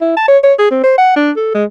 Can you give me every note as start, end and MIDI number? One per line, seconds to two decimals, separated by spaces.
0.01 0.15 64
0.17 0.24 81
0.28 0.37 73
0.43 0.53 73
0.59 0.70 68
0.71 0.80 60
0.84 0.94 72
0.98 1.14 78
1.16 1.31 62
1.37 1.54 69
1.54 1.65 56